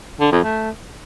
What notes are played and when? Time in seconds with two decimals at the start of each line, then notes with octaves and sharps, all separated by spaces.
0.20 D3
0.32 F2
0.43 A3